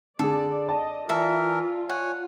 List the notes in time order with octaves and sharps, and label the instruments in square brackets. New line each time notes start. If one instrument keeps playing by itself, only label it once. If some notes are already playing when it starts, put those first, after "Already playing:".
[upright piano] D3 G#4 [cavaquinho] A4 [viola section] D5
[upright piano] D5 A5 [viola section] D#5
[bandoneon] E3 A#4 [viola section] F4 [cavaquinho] A4 E5
[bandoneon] C#5 G#5 [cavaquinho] F#5